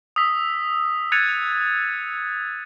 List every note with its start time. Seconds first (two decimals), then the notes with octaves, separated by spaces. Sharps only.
0.16 D#6 E6 B6
1.12 F#6 G#6 A6 C#7 D#7 F7